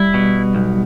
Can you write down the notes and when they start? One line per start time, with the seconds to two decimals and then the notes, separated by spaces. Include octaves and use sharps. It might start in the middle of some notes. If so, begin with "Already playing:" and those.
Already playing: G3 E4
0.14 B2
0.55 B1